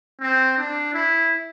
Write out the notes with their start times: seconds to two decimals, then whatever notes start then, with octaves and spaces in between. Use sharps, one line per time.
0.21 C4
0.58 D4
0.94 E4